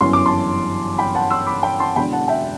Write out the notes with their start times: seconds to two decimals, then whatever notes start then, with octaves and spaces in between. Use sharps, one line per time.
0.01 G1 F#2 E3 C6
0.13 D6
0.26 A5 C6
0.98 G5 B5
1.15 F#5 A5
1.30 C6 E6
1.47 B5 D6
1.63 G5 B5
1.80 A5 C6
1.96 E1 E2 D3 G5 B5
2.12 F#5 A5
2.28 E5 G5